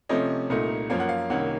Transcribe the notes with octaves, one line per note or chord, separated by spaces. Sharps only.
C3 F3 A3 C#4 D#5
C2 A#2 A3 D#4
F#2 F3 A#3 C#4 F5
F#5
F5
C2 C3 D#3 A#3 C#4 F#5